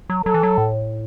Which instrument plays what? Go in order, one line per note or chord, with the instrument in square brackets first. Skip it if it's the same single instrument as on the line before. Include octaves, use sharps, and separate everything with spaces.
[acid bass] F#3
[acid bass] F#3 [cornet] A4
[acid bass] E3
F#3
A2